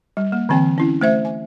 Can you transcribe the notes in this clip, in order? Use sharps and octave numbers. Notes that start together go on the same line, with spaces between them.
G3
A#3
D3 E3 C4 G5
C#4 E4
A3 C5 E5
G#5